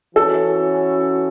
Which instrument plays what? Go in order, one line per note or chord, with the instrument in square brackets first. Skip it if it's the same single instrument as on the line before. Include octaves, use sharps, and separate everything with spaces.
[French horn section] E3 C#4 F#4 [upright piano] A4